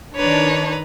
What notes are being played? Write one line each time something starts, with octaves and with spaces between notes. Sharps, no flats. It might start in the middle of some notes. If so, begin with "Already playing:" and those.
D#3 D4 B4 C#5 A#5